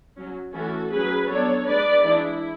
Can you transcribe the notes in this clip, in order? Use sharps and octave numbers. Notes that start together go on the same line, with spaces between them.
F#3 C#4
E3 A3 C#4 F#4 A4
F#3 C#4 G#4 B4
F#3 B3 D4 A4 C#5
G#3 D4 B4 D5
E3 G#3 D4 E4